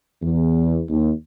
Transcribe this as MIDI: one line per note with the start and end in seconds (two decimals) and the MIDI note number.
0.22 0.83 40
0.90 1.11 39